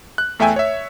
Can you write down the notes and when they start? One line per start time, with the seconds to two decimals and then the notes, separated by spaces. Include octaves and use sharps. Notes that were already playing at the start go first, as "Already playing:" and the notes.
0.18 F#6
0.39 E2 A3 E5 G5 G#5
0.56 C#5 E5